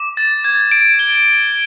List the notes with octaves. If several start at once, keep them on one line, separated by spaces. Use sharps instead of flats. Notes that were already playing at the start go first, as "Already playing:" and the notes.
Already playing: D6
A6
G#6
D7
G7